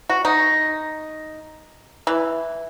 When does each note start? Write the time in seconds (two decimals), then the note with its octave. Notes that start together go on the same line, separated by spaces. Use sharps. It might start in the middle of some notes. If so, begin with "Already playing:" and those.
0.10 F#4
0.25 D#4
2.07 E3